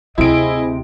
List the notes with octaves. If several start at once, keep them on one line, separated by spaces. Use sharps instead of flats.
D2 C3 E4 G#4 D#5 D7